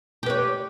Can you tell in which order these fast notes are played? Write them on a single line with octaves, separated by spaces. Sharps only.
G4 B4 C#5